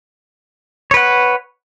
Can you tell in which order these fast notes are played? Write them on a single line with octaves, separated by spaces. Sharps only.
C#5 B4 F#5